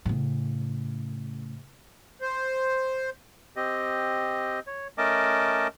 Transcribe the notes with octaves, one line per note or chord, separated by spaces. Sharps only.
A2 C#3
C5
C4 G4 D#5
C#5
A3 C#4 A#4 D#5 A5 D6